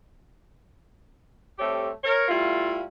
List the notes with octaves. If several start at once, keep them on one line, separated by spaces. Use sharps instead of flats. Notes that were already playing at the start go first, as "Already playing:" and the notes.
G3 A3 C4 G4 A4 C#5
A#4 C#5
G3 A3 E4 F4